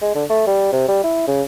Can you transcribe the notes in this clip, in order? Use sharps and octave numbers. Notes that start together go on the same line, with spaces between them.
G#3
D3
A3
G3
C3
G3
E4
C#3